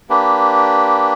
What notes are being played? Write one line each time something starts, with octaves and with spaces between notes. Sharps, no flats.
A#3 D4 G4 B4